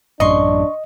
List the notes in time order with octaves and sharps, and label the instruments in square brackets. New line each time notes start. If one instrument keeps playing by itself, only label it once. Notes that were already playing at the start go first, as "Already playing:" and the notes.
[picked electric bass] A1 F#2 [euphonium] D4 [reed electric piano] D#5 [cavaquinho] C6 C#6